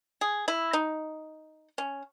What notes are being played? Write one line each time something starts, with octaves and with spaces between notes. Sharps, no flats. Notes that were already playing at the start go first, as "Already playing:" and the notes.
G#4
E4
D#4
C#4